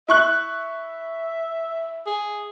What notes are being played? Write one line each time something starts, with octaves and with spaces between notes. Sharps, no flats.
E4 E5 C#6 F#6
G#4